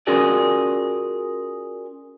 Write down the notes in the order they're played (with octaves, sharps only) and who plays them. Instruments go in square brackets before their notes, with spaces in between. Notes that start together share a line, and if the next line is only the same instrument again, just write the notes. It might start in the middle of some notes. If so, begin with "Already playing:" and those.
[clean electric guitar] C#4 F4 F#4 G#4 A#4 D5